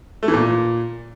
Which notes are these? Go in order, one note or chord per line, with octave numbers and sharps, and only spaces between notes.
A3
E3
A#2